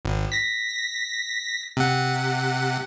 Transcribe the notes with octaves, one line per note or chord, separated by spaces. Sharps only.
G#1
A#6 B6
C3 F#5